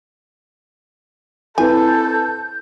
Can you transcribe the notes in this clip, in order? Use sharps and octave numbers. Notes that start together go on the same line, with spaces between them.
C4 E4 A4 B4 G#5 G6